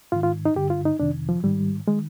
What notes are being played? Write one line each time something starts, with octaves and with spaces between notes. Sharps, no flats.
G#2 D#3 F4
F4
D#4
G2 D3 G4
F4
D#4
F2 C3 D#3 D4
F3
G#2 D#3 G3
D#3 G#3